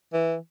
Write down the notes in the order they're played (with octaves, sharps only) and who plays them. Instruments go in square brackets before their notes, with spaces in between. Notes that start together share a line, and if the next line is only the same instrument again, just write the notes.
[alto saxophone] E3